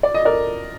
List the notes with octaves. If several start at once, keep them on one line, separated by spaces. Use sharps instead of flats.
D5
D#5
A#4 D5